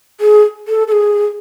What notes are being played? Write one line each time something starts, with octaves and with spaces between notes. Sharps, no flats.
G#4
A4
A4
G#4